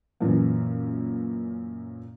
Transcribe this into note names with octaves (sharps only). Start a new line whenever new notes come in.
F#2 A#2 E3 A#3